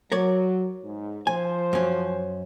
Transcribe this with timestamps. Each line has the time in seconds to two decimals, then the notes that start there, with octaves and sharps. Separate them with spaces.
0.12 F#3 A#4 C#5 D5
0.84 G#2
1.27 F3 C5 G#5
1.73 F#2 C#4